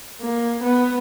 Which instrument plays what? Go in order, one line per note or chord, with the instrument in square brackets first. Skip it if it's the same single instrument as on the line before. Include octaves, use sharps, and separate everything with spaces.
[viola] A#3
B3